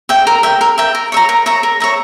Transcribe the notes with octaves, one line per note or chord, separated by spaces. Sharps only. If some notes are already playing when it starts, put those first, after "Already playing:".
E5 G5
A#4
E5 G5
A#4
E5 G5
A#4
C#5 E5 A#5
A#4
C#5 E5 A#5
A#4
C#5 E5 A#5